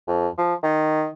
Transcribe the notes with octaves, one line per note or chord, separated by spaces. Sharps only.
F2
F3
D#3